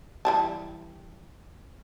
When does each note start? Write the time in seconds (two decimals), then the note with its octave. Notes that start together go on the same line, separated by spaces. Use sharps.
0.25 E3 G3 A5